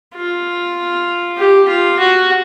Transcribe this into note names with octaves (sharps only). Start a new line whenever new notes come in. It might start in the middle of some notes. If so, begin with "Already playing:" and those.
F4
G4
F4
F#4